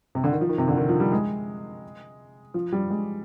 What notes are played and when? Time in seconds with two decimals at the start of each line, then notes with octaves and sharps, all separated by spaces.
0.15 C3
0.24 D3
0.32 D#3
0.41 F3
0.49 D#3
0.58 C3
0.68 D3
0.77 D#3
0.89 F3
1.00 G3
1.12 G#3
2.54 F3
2.72 G3
2.90 G#3